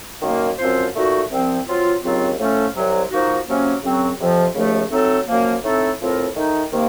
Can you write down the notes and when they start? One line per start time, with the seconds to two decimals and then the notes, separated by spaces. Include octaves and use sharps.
0.22 F#2 D#3 A#3
0.58 F#2 F3 C4 F4 C5
0.94 A#2 A3 D#4 F#4
1.30 C2 C3 F3 C4
1.67 F#3 C4 F4
2.03 D#2 C#3 F#3 C4 F4
2.38 A2 F3 A3 C#4 A4
2.74 C2 C3 F#3
3.10 F3 A#3 D#4 F#4
3.47 C3 F#3 A#3 C#4
3.82 F#2 C#3 F#3 C4 F#4
4.18 F2 C3 F3 C4
4.55 D#2 C#3 F3 A3
4.91 F#3 A3 C4 D#4 A4
5.26 F#2 F3 A#3
5.63 A2 A3 C4 D#4 A4
5.99 A2 F3 C4 F4 A#4
6.35 D#3 A3 D#4
6.71 C3 D#3 A#3